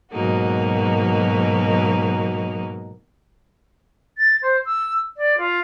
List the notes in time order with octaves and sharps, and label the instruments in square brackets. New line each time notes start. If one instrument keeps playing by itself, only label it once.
[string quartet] G#2 B2 F#3 A#3 D#4 F#4
[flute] A6
C5
E6
D5
F4